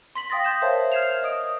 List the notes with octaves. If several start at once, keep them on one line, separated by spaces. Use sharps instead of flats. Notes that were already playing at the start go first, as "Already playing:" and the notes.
C6 B6 F#7
F5 G5 D#6 A6 A#6
C6 G6 E7
A#4 C5 C#5 E5 F5 A5
F6 G6 G#6 C7 E7 F7
D#5 D#6 D7